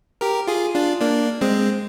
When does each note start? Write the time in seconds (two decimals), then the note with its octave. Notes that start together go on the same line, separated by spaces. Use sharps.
0.21 G4 A#4
0.47 F4 G#4
0.74 D4 F4
1.01 A#3 D4
1.41 G#3 C4